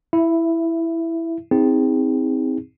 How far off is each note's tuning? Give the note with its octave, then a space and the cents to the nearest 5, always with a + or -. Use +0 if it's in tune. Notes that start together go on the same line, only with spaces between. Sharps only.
E4 +0 E5 +20
C4 +0 D#4 +35 G#4 -25